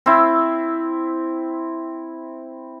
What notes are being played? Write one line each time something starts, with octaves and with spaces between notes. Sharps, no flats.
C4 E4